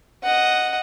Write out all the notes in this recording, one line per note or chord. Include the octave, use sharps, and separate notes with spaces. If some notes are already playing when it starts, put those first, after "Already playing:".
D#5 F#5